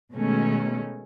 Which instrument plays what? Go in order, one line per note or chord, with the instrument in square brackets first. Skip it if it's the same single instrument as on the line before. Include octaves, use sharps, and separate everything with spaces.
[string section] B2 D#3 G#3 A3 C#4